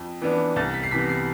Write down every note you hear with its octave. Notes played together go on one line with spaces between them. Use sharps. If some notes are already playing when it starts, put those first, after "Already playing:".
Already playing: F2
E3 B3 D4
C2 A6
B6
C7
C3 E3 B3 B6
C7